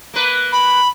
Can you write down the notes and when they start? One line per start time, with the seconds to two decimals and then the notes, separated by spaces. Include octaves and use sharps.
0.14 A#3 B4
0.52 B5